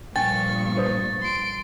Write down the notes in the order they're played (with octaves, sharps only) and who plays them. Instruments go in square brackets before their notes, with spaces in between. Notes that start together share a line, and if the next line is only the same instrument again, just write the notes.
[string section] G2 A#2 F3 [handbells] G5 G#5 [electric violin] C#6 [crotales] A6
[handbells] B4 C5 D#6
[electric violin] C6 D7